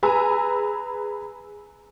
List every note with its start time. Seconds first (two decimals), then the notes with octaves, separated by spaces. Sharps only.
0.03 G#4 B4 G#5 A#5 B5 E6